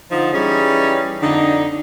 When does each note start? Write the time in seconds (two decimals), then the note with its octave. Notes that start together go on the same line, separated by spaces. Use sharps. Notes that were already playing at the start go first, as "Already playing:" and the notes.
0.11 D3 F3 D#4
0.34 E3 G3 C#4 D#4 G#4 C#5
1.22 F2 D3 D4 D#4